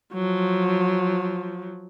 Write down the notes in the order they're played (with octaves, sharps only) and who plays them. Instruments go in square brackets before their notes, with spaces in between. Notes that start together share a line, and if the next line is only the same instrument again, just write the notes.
[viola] F3 F#3